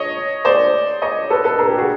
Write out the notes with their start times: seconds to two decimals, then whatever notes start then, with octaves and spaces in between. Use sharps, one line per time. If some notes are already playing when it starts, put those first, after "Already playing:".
Already playing: C#5 D#5
0.45 C5 D5
1.02 C#5 D#5
1.30 A4 B4
1.44 A4 B4
1.59 G#4 A#4
1.68 G4 A4
1.78 F#4 G#4